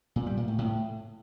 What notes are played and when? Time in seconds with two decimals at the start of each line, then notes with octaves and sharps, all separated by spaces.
0.16 A#2
0.26 G3
0.37 A#2
0.48 A2
0.58 A2